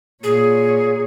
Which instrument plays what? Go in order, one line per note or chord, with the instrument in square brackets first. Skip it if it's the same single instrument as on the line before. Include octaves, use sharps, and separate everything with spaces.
[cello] A#2 C#5 [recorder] G#4